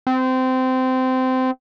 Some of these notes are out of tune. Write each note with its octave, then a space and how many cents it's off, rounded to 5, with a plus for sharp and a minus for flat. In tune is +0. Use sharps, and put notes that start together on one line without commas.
C4 -20